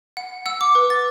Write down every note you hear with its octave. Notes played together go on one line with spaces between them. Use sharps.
F#5
F#5 E6
D6
B4
A6